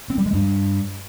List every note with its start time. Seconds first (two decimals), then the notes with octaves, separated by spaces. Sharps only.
0.10 C4
0.18 G3
0.26 G#3
0.34 G2